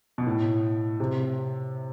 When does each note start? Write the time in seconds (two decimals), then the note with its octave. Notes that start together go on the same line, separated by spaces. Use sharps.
0.18 B2
0.27 A2
1.00 C3